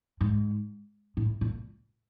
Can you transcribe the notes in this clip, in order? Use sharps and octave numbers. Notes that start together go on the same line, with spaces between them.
G#2
A2
A#2